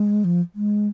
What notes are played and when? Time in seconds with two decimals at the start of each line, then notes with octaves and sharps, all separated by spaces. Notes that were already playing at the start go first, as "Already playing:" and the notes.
Already playing: G#3
0.24 F3
0.55 G#3